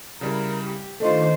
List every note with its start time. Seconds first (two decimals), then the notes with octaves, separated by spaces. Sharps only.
0.21 C#3 G3 E4 A#4
0.64 G4
1.00 D#3 A3 D4 F4 A4 C5 D#5 A#5